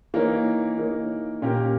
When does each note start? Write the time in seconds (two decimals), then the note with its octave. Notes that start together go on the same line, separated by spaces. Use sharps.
0.14 E3 A#3 D#4 A#4 C#5
0.78 E3 A#3 D#4 A#4 C#5
1.42 A#2 A#3 C#4 G4 A#4